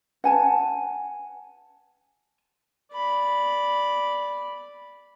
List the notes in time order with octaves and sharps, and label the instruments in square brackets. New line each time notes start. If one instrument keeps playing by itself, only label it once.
[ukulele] F#5 G#5 A5
[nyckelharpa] D5 B5